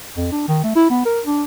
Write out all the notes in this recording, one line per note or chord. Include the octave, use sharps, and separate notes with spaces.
F2
D4
D#3
A3
E4
B3
A#4
D4